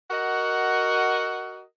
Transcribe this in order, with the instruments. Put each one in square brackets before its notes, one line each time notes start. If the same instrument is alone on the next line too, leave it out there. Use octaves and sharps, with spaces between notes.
[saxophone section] F#4 A#4 D#5 F#5